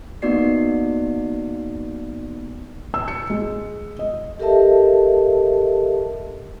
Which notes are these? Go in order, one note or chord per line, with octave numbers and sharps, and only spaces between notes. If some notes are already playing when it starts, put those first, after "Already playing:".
A#3 B3 D#4 F#4 D5 C7
E6
C#7
G#3
D#5
G4 A4 A#4 D#5 E5 A5